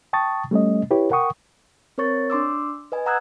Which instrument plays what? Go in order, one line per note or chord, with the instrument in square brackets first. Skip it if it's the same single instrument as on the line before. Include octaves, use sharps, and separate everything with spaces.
[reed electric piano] G5 A5 C#6 D#6 A6
G3 A3 C#4 D#5
E4 G4 B4 C#5
A#4 F#5 G5 C#6 D#6
[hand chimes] C4 A#4 C#5 C#6 A6
D4 C6 D6 E6
B4 D#5 G#5
F#5 A#5 D#6 E6 F#6 G#6